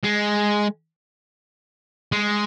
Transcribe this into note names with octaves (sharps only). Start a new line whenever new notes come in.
G#3
G#3